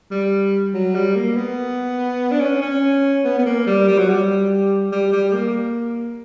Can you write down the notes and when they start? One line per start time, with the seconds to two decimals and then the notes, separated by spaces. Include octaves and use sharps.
0.11 G3
0.74 F#3
0.95 G3
1.16 A#3
1.36 B3
2.31 D4
2.41 C#4
2.62 C#4
3.25 B3
3.39 B3
3.46 A#3
3.66 G3
3.88 G3
3.98 F#3
4.10 G3
4.91 G3
5.12 G3
5.33 A#3